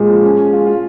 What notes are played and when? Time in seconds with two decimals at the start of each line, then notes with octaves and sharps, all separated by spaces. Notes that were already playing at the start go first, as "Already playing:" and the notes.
Already playing: A#2 G#3 G#4
0.09 F3
0.23 C#4
0.37 C#4
0.53 F4
0.66 F4